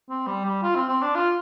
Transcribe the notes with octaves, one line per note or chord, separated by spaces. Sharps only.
C4
G3
G3
F4
C4
C4
D4
F4